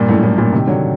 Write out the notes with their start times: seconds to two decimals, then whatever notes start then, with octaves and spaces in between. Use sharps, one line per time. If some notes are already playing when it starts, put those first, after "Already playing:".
Already playing: G2 A#2
0.09 F#2 A2
0.23 F#2 A2
0.38 G2 A#2
0.53 C3 D#3
0.67 D3 F#3